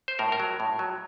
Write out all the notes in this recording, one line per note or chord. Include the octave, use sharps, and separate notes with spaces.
C5
A2 A#4
A#4
F#3
A2
F#3